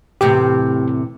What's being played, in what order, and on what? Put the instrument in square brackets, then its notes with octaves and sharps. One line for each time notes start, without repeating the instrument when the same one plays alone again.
[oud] E2 A2 C3 [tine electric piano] G4